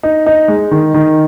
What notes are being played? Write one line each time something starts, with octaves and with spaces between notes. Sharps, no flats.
D#4
D#4
G#3
D#3
D#3